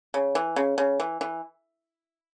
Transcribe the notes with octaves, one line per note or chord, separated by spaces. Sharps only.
C#3
E3
C#3
C#3
E3
E3